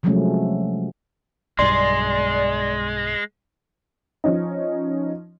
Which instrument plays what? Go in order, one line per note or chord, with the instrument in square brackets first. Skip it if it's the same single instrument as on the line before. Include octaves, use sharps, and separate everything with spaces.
[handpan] C3 F3 F#3 G#3 A3 C#4
[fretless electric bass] B1 G2 [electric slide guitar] G#3 [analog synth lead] D5 [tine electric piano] C6
[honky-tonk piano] F3 C#4 D#4